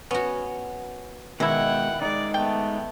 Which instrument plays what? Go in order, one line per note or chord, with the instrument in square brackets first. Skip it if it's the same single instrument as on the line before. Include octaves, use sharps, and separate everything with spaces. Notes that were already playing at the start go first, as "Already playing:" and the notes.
[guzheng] B3 F#4 [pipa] C#4
[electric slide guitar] B2 G#3 [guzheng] D#3 [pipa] E3 E4 [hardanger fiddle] F#5 G5
[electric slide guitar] G#3 D#4 [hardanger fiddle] D5
[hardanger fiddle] A3 B3 [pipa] G5